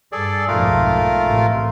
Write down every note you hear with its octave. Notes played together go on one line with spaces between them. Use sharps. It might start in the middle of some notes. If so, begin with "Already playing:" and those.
G2 G#4 A4 D5
B1 F2 G#2 A3 F4 A#4
A1 C3